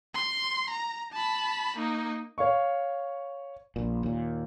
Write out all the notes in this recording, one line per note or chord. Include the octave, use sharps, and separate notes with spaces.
C6
A#5
A5 B5
A#3 D#4
C#5 F5 C#6
A#1 A#2
D#2 A#2